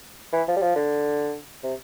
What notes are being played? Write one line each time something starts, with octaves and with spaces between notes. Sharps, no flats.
E3
F3
G3
F3
D3
C3